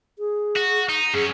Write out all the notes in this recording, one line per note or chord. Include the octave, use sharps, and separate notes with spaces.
G#4
F#4
D#4
F#2 C#4 G#4